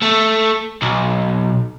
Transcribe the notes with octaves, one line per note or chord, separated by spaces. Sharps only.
A3
B1